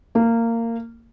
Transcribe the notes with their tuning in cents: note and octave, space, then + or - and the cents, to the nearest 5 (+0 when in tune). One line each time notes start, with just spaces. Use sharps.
A#3 -20